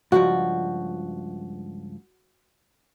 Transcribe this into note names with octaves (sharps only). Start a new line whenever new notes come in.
C#2 G2 F3 F#4